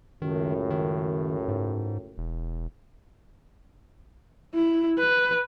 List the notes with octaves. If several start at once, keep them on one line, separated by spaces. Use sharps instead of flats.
C#2 F#2 A2 D#3
D#3
G#2
E1
E4
B4